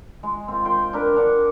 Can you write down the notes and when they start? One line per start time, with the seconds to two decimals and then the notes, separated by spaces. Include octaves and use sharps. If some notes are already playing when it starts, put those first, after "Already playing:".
0.23 G#3
0.48 C4 F4
0.65 G5 C6
0.93 D4 A#4 B4
1.16 D4 A#4 F#5